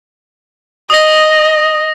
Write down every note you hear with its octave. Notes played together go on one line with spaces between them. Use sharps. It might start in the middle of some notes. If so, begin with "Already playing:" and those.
D#5 D#6 A#6